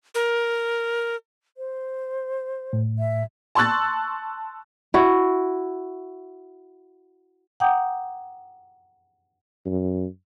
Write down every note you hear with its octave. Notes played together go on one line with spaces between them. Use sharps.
A#4
C5
A2
E5
A5 C6 C#6 E6 F#6 A6
E4 F#4
F#5 G5 A#5 D6 D#6 G6
F#2